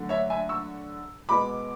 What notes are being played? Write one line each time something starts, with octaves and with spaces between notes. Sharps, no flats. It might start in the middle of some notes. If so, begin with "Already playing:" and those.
Already playing: D3 F#3 A3
C#5 E5
E5 G#5
C#6 E6
B2 G#3 B3 B5 D6